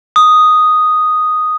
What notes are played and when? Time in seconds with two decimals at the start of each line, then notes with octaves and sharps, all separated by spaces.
0.16 D#6